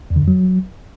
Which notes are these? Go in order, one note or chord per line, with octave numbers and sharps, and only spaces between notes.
E2
D3
F2
F#3